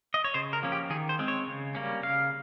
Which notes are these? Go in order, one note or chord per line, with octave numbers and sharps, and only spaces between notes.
D#5
C#5
C#3 C5
A#4
F3 A#3 C#4
G4
D#3 G#4
C5
G#3 C4
C#5
C#3
G3 A#3 C#4
C#3 F5